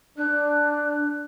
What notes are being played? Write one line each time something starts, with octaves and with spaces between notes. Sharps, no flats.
D4 F#6